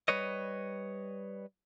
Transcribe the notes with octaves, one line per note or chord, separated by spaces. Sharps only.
G3 B4 C#5 D#5